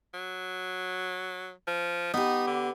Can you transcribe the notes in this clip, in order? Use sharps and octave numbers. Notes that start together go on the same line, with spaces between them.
F#3
F3
B3 D#4 G4
D3